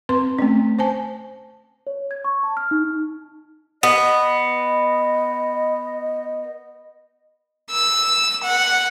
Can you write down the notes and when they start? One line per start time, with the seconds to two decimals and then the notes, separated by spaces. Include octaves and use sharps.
0.09 C4 B4 C6
0.39 A3 C4 C#4
0.79 C5 G#5 A5
1.87 C#5
2.11 G#6
2.25 C#6
2.43 A5
2.57 F6
2.71 D#4
3.83 B3 D#5
7.71 E6
8.43 F#5